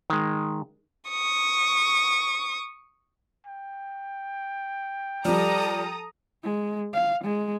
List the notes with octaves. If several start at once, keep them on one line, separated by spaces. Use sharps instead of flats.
D#3 G#3
C#6 D#6
G5
F3 G3 A4 D5 A#5 D#6
G#3
F5
G#3